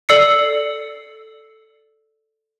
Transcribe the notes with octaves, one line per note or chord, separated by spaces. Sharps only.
A4 D5 E6 C7 C#7